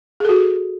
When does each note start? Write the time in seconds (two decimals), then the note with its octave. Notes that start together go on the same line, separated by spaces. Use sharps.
0.20 G#4
0.25 A4
0.29 F#4